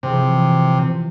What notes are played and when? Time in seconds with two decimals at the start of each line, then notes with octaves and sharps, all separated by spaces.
0.03 C3 E3 F3